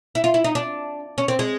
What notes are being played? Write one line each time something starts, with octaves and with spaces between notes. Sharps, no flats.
E4
F4
E4
D#4
D4
C#4
C4
G#3